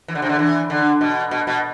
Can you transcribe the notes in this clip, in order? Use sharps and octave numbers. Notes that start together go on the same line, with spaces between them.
E3
D3
C3
D3
E3
D3
B2
B2
B2